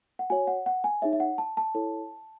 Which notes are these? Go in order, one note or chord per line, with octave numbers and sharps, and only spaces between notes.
F#5
F#4 C#5 G#5
F#5
F#5
G#5
D#4 G#4 C#5 E5
E5
F#5
A5
A5
E4 A4 C#5